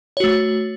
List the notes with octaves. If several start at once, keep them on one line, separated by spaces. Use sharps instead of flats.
A3 F#4 C#5